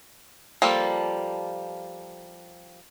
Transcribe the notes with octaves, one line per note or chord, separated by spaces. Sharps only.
F3 G3 A#3 A4